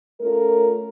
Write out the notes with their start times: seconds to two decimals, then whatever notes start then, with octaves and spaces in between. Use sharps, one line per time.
0.21 A3 C#4 F4 A#4